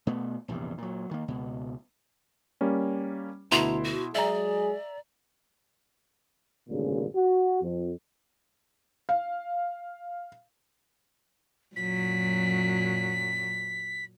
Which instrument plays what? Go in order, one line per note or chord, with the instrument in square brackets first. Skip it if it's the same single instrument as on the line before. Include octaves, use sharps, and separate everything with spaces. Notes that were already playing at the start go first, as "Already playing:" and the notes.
[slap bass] B2 A3 B3
A#1 E2 G2 C3
A#2 F#3
D#3 A#3
C#2 B2
[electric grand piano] G3 A#3 C#4
[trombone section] D2 [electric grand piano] B2 E4 C6 [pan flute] A#5
[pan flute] F#4
[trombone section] F#3 G#3 G#4 [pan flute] D5 [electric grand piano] E5 A#5
[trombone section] G#1 D2 G2 A#2 C#3
F#4
F2
[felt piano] F5
[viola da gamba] F#2 A#2 F#3 [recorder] B6